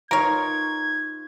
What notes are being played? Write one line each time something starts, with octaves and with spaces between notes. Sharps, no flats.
D#4 F4 A#4 B4 C#5 G#6